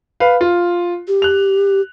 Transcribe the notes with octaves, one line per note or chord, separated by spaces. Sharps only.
B4 F5
F4
G4
F#6 F7